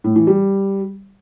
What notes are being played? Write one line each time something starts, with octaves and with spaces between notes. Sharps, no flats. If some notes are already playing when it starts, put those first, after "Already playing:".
A2
E3
G3